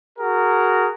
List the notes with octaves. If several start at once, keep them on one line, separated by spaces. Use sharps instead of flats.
F#4 G#4 A#4